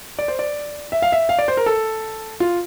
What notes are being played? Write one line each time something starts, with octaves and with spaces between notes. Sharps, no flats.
D5
C5
D5
E5
F5
E5
F5
D5
C5
A#4
A4
F4